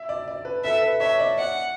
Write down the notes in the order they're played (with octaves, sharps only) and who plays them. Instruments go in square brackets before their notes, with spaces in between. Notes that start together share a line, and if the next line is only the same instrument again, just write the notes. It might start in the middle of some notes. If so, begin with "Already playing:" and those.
Already playing: [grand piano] E5
D5
D5
B4
[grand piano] A4 [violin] E5
[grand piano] B4
[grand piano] C#5 [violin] E5
[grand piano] D5
[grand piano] D5 [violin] F#5